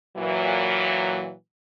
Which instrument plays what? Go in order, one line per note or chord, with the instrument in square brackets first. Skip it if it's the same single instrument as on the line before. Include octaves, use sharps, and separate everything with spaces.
[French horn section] A#2 E3 F#3